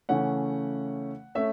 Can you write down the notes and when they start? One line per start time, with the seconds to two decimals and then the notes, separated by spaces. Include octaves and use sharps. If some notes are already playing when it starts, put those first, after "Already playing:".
0.09 C#3 E3 A3 C#4 F#5
1.35 A3 C#4 E5